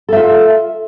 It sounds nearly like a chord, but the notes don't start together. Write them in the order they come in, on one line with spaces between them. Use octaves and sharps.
A4 E5 F4